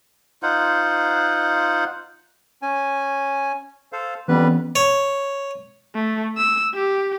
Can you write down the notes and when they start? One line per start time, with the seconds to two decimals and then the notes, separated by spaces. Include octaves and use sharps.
0.43 D#4 F4 C5 F#5
2.62 C#4 G#5
3.92 A4 C5 F5
4.28 F2 E3 G3 B3 C#4 B4
4.76 C#5
5.95 A3
6.37 E6
6.74 G4